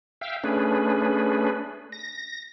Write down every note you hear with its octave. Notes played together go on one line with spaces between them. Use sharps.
E5 F5 G5
A3 C#4 D4 G#4 B4
A#6